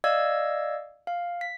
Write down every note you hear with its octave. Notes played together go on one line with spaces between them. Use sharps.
D5 D#5 F5 E6 G#6
F5
B6